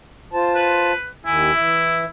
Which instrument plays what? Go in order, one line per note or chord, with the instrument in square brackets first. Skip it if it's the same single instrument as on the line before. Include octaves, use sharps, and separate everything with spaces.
[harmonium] F4 C5 A5
[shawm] B4
[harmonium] D#2 D#3 G#5 [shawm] E4
[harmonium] E3 E5